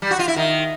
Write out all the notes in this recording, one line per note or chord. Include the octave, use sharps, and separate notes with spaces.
G3
F#4
F4
E4
D#3